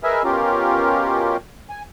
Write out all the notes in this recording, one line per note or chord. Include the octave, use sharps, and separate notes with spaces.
G#4 A#4 B4 D#5 E5 G#5
B2 C#4 F4 G4 A#4
G#5